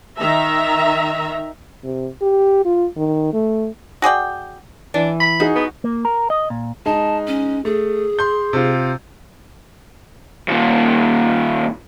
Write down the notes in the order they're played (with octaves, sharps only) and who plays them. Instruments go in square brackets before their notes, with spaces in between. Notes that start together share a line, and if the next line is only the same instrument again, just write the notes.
[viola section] D#3 E5 A#5
[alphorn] C3
G4
F4
D#3
A3
[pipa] F#4 G#4 D5 G5
[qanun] E3 [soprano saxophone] D4
[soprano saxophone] B5
[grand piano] D#4 G#4 [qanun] F#4
[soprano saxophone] B3
[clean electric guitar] A#3
A#4
D#5
A#2
[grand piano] G#3 D#4 [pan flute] A5
[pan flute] C#4
[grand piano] A3 [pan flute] G#4
[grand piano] C6 G6
C3 F4
[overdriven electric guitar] D#2 A#2